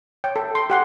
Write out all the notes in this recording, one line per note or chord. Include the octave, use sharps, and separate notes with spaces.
C#5 G5
A4
C6
G4 F#5 C6